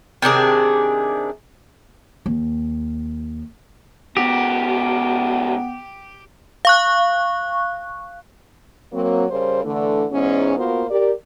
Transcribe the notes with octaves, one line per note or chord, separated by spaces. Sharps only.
C3 D#3 D4 G#4
D#2
C#2 B3 F#4 G4
F5 C#6 F#6
F#3 A#3 C4
C#3 G3 A#4 C5
D3 E3 A3
E2 G#2 C#4
A#3 B3 F4 F#4 A#4 C5
G4 A#4 D5